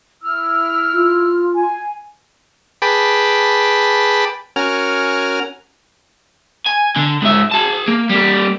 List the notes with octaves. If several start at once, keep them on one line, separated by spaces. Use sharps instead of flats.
E4 E6 F6
F4
G#5
G#4 B4 G5 A5 B5 D6
C#4 F#4 A#4 G#5 F6
G#5
D3
G#2 E5
G#4 A5
A#3
G3 A#3